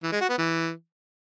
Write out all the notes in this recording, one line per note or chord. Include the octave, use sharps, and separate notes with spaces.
E3
G#3
F#4
B3
E3